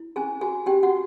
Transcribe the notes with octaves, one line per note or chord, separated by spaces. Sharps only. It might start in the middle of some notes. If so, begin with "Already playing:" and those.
Already playing: E4
C#4 G#4 G#5
F#4 G#4 G#5
C#4 G4 G5
F#4 F#5